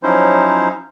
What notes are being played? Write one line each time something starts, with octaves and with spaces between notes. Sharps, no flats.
F3 F#3 C#4 D#4 E4 C5